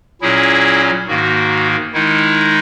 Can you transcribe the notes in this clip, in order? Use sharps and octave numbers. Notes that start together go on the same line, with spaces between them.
A#2 F#3 C#4 E4 G#4
G#2 D#3 A#3 F#4
D#3 G#3 D#4 E4